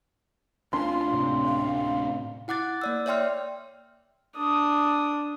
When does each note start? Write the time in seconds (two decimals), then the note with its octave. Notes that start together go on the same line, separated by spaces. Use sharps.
0.73 D2 C#4 D4 F4 C6
1.10 A2 C3
1.45 F5
2.48 E4 F#5 D6 F#6 A6
2.81 A#3 D5 E6
3.06 C#5 D5 E5 G5 C6 F6
4.37 D4 D#6